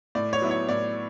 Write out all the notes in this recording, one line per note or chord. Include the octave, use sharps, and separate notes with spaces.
A2 D5
C#5
F#3 B3 E4
C#5
A2 D5